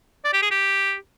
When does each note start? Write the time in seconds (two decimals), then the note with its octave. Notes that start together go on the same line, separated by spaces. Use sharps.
0.24 D5
0.33 G4
0.42 G#4
0.51 G4